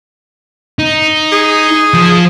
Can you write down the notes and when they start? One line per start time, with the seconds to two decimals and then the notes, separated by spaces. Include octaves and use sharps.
0.79 D#4
1.32 G#4
1.94 F3